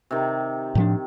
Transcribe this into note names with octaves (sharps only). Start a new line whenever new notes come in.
C3 D#3
A2 F3 D4